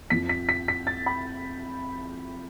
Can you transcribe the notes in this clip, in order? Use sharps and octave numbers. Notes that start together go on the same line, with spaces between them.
F2 F3 B6
B6
B6
B6
A6
B5